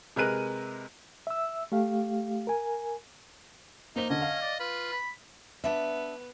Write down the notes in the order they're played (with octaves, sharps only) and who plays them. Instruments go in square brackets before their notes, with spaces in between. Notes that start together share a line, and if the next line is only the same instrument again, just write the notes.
[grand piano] C3 G#3 A#4 B4 F#6 D#7
[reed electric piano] E5 E6
A3 G4 F5
A#4 G#5
[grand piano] A#3 C5 G7 [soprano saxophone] D#4
[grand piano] D3 [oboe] C#4 [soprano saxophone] D#5
[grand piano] F5
[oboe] D5
[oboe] F4 [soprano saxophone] B4
[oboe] B5
[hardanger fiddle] B3 [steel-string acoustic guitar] D4 E5